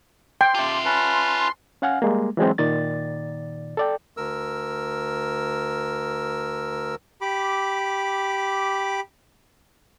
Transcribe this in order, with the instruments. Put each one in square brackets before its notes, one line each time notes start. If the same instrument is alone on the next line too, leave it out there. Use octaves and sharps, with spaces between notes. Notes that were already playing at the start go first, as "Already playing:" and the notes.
[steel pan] G5 [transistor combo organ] C6
[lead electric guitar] F4 E5 [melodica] G4 A5
[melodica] C#4 B4 A5
[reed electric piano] C#4 F5 F#5 G#5 F6
G3 G#3 A#3
E3 F#3 G#3 C4
A#2 D#3 D5 A6
A4 D5 G5
[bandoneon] D2 A#4 E6
[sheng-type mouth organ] G4 B5 D6